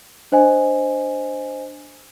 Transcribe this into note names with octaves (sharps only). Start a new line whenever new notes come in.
D4 C5 D#5 G#5